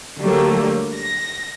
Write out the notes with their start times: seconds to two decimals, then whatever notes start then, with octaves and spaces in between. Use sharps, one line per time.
0.17 D3 F#3 G3 A3 A#3
0.93 A#6